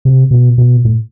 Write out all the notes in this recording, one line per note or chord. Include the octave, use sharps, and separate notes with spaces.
C3
B2
B2
A2